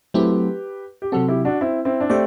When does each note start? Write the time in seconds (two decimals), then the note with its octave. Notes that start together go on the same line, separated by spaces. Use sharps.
0.14 F#3 A3 C4 E4 G4 B4
1.02 G4
1.12 C3 F#3 C4 F#4 A4
1.28 E4 G4
1.45 D4 F#4
1.61 C4 E4
1.85 C4 E4
2.00 D4
2.10 A3 C4 G4 D5